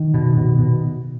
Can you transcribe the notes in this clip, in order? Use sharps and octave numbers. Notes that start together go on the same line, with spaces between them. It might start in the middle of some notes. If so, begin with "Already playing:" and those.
Already playing: D#3
B2
B2
B2